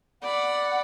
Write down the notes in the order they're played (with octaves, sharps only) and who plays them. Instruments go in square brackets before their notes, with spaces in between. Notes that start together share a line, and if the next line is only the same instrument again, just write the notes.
[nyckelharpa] D5 B5 [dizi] F#5